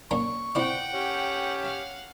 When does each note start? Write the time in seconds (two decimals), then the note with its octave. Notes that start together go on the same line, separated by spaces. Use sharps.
0.11 A#3 C#4 D4 C#6
0.55 C4 E4 D5 F#5 G5
0.94 C#4 G4
1.62 F5 F#5